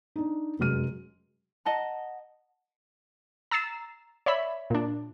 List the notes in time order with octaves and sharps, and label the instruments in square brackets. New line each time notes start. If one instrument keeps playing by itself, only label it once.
[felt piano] D4 D#4
F1 F#2 F#3 G#3 F6 D#7
[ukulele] D#5 F#5 A5 A#5
[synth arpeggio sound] A#5 E6 A6 C7 E7
C#5 D5 E5 B5
A#2 D4